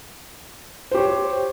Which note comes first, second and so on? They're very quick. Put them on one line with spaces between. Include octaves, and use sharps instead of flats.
C5 G4 C#5